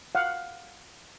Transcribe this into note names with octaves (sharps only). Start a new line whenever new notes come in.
F5 F#5